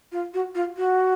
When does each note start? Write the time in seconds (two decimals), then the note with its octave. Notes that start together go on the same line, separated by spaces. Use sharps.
0.12 F4
0.34 F#4
0.55 F4
0.77 F#4